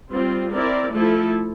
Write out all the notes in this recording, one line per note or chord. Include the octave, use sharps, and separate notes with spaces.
G3 C4 F4
C4 E4 A#4 D5
F3 A3 E4 A4